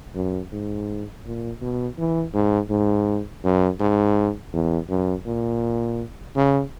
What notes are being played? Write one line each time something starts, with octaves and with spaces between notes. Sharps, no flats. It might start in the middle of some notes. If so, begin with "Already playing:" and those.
F#2
G#2
A#2
B2
E3
G#2
G#2
F#2
G#2
E2
F#2
A#2
C#3